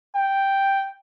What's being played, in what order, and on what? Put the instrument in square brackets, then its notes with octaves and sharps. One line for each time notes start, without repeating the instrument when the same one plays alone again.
[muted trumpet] G5